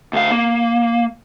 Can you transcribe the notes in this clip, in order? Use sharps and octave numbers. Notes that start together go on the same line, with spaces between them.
D2 F5
A#3